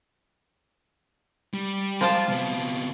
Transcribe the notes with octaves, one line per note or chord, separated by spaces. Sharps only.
G3
F3 F4 A5
C3 B3